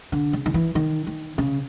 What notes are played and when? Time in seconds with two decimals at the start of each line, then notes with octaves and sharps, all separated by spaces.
0.12 D3
0.33 C#3
0.46 D#3
0.54 E3
0.75 D#3
1.07 D#3
1.38 C#3